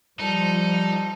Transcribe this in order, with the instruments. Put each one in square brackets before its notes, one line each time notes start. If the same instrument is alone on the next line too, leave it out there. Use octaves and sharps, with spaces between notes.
[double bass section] F3 [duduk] G3 [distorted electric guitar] D#4 [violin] A4